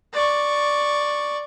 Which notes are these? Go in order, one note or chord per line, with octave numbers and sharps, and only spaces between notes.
D5 C#6